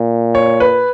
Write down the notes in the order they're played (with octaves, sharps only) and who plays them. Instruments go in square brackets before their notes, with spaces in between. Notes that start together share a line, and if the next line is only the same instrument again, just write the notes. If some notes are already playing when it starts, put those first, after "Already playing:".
Already playing: [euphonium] A#2
[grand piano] C#5
B4